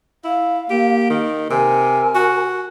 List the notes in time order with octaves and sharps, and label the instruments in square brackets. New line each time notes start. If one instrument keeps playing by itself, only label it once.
[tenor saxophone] E4 [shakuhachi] F5
[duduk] A#3 [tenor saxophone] G4
[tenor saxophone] D#3
[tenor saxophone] C3 [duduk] A#4 [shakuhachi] G#5
[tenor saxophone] F#4